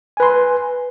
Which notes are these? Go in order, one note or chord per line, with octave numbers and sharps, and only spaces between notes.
B4 G#5 C6